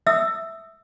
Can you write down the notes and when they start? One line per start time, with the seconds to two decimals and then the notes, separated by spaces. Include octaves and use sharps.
0.07 E5 D#6 E6